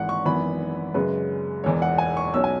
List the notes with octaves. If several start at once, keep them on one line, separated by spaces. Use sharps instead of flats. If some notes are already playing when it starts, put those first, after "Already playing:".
Already playing: G#1 G#2 E3 F#5
C#6
G#1 F#2 E3 B3 B5
F#2 C#3 G#3 B4
E1 E2 E3 C#5
F#5
G#5
C#6
B1 B2 F#3 C#4 E6
G#5